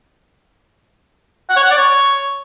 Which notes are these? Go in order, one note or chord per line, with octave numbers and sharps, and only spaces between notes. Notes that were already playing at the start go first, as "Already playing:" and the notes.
F#5
C#5
F#5
D5
C#5